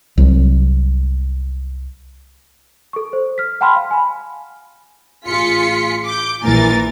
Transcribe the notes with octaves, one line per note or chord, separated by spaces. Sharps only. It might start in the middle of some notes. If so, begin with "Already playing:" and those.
C2 F#3
A4 C#6
C5
F6 B6
F#5 G5 A5 B5 C6 F6
F5
G#5 B5
A1 F4 G#4 C6 B6 C#7
D6 G6
A#1 A#2 E3 A#4 G#5 A6